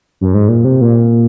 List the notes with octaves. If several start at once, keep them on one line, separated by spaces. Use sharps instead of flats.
F#2
G#2
A#2
C3
A#2